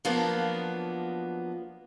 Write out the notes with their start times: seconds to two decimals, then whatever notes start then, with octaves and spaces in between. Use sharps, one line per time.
0.05 F3 F#3 A#3 B3 D4